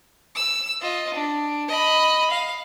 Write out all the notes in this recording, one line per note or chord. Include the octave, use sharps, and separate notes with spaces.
E6
F4 D#5
D4
D#5 B5
F5